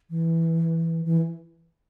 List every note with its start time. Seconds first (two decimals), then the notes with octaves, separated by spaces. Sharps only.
0.10 E3
1.05 E3